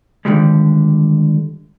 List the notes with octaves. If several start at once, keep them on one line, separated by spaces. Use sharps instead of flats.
D3 D#3 F3 G3 G#3